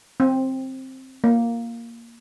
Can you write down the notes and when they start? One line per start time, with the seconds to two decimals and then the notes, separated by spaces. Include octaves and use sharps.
0.20 C4
1.24 A#3